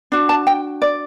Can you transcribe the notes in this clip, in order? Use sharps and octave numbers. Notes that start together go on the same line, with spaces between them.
D4 F#4
A5
G5
D5